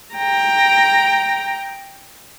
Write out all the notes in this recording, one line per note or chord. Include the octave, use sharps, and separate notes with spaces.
G5 A#5